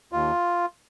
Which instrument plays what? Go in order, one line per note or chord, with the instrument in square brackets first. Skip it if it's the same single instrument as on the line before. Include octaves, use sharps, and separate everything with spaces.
[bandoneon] D#2 F4